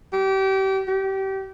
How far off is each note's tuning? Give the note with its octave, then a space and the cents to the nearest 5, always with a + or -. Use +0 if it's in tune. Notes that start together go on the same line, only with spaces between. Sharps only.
G4 -30
G4 -25